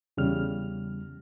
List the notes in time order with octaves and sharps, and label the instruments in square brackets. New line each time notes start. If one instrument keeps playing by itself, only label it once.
[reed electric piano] E2 C#3 G3 F6